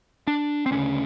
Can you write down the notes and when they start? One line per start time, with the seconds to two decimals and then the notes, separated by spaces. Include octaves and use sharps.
0.27 D4
0.66 C4
0.71 D2 C#3 C#4